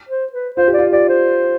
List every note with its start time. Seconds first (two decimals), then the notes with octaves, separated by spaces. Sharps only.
0.09 C5
0.33 B4
0.56 F4 C5
0.68 G4
0.74 F4 D5
0.93 G4 D5
1.09 C5